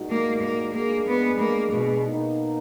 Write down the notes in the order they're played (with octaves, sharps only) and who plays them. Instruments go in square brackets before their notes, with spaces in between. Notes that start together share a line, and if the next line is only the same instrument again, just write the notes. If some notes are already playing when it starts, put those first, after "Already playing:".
Already playing: [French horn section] A#2 G#3 D#4 F#4
[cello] A#3
A#3
[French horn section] G#3 D4 G#4 [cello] A#3
[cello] B3
A#3
B2
[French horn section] B2 A#3 D#4